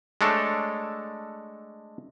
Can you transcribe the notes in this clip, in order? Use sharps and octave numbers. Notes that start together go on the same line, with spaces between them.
G#3 A3 D4 A4 C#5